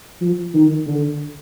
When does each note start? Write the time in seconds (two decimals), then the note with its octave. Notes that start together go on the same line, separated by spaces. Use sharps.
0.21 F3
0.54 D#3
0.86 D3